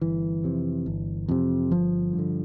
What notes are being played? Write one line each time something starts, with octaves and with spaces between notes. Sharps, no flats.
G1 E3
F2 C3
G1
F2 C3
G1 F3
G2
D3